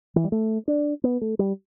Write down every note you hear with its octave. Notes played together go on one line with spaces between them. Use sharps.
E3
G3
A3
D4
B3
A3
G3